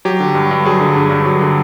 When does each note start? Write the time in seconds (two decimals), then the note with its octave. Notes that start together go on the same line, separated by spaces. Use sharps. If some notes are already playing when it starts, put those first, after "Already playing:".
0.05 F#3 G4
0.20 D3
0.35 G2
0.51 G2
0.65 F#3 G#4
0.81 D3
0.96 G2
1.11 G2
1.25 F#3
1.41 D3